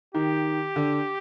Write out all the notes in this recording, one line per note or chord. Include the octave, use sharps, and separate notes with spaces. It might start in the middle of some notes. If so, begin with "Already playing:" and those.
D#3 G4
D3